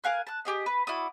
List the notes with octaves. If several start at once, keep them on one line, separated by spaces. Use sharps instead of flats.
A#4 F5 G#5 F#6
A5 F#6
G4 G#4 D#5
B4
E4 F#4 D5 D#6